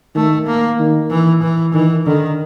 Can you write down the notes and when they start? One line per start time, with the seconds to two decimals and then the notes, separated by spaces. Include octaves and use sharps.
0.15 D#3 A3
0.47 A#3
0.79 D#3
1.10 E3
1.42 E3
1.73 D#3 E3
2.06 D3 D#3